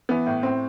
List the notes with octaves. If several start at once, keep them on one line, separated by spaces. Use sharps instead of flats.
E3 B3
A2
A2 C4